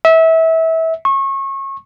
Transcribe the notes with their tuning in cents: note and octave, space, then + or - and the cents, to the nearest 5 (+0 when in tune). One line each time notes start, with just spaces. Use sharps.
E5 -25
C#6 -30